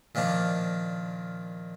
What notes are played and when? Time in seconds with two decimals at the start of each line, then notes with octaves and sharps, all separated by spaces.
0.15 A#2 D#3 F3 D4